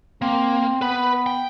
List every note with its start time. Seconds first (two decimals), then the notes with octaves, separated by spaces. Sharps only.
0.22 A#3 C4
0.81 B3 B4 B5
1.26 G5